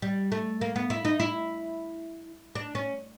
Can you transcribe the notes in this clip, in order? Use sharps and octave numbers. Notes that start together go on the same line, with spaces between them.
G3
A3
A#3
B3
E4
D#4
E4
D4
C#4